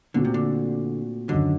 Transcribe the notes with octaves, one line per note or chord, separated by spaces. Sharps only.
A#2 D3 A3 C4 F#4
C3
D3
F#2 D3 D#3 F#3